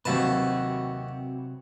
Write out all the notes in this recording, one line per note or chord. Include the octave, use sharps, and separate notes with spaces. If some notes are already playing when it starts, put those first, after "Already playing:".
D#2 C3 F#3 C4 F#4 B4 A5